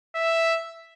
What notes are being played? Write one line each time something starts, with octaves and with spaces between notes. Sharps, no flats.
E5